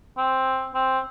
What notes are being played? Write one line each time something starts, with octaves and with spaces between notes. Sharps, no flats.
C4
C4